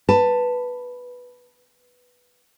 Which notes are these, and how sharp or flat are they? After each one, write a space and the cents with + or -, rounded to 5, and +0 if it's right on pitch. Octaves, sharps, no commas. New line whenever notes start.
B4 +0 A5 +15